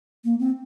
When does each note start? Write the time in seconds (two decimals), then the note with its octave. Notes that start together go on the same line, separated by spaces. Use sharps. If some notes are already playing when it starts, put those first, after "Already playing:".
0.25 A#3
0.39 C4